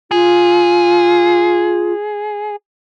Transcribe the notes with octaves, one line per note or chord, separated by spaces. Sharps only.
F4 G#4